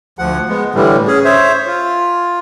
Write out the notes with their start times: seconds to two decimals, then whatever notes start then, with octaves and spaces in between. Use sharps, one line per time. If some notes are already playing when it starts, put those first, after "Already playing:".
0.19 D2 F3 F#5
0.49 G#3 B3
0.74 A2 D3 E3 G3
1.07 C#4 G#4
1.24 C5 C#5 E5
1.67 F4